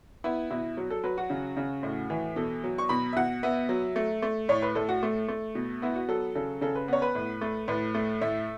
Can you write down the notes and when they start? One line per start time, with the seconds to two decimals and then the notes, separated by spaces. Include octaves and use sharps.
0.24 B3 E4
0.50 B2 E4
0.77 F#3
0.90 A4
1.04 F#3 B4
1.18 F#4
1.30 C#3
1.57 C#3
1.83 A2
2.10 E3
2.36 B2 A4
2.64 F#3
2.78 C#6
2.89 B2 B5
3.13 E5
3.17 B2 F#5
3.43 B3 E5
3.69 F#3
3.96 A3
4.22 A3
4.49 A2 C#5
4.62 B4
4.75 A2 A4
4.89 F#4
5.03 A3
5.28 A3
5.55 B2
5.82 B3 E4
5.95 F#4
6.08 F#3 A4
6.35 C#3 A4
6.61 C#3 A4
6.75 B4
6.88 B3 C#5
7.02 B4
7.15 A2
7.41 A3
7.68 A2 B4
7.95 A3
8.21 A2 E5